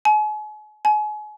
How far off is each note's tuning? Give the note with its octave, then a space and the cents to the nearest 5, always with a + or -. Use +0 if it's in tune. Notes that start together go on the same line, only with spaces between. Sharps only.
G#5 +40
G#5 +35